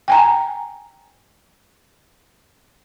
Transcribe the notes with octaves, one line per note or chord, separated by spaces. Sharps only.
G5 G#5 A#5